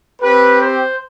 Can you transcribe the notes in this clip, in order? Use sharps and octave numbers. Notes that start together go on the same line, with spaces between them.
C4 G4 B4
C5